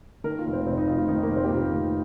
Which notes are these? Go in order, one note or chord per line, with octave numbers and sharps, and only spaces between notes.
D#3 A#4
F4
F1
C4
F1 C4
D#4
F1 F4
F4
D#3 D#4
A#3
F1
C4
G4
F1 F4
D#3